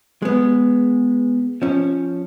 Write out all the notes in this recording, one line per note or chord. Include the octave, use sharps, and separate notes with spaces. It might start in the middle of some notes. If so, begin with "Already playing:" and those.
G#3 B3
F3 C#4